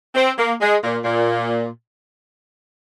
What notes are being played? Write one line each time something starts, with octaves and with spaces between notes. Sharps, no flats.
C4
A#3
G#3
A#2
A#2